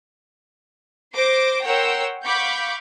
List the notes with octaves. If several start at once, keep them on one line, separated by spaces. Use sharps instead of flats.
C5 C6 D6 A#6 D7
A#4 C#5 F#5 G5 C6 E6
F5 F#5 B5 C#6 D6 G6